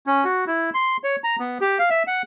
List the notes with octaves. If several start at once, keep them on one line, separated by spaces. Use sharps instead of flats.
C#4
F#4
E4
C6
C#5
A#5
B3
G4
F5
E5
F#5